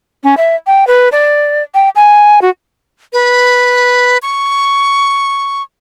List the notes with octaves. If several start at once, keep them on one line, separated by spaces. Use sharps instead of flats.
C#4
E5
G5
B4
D5
G5
G#5
F#4
B4
C#6